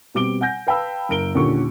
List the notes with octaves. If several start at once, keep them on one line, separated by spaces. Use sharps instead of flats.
B2 G3 C4 D6 D7 G7
F#5 G#5 G6 A#6
B4 F5 G5 A5 B5 E6
F#1 A#4 D7 G7
D#2 A#2 D3 C#4 F4 C#6